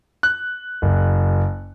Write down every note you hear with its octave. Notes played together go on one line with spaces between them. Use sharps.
F#6
F#1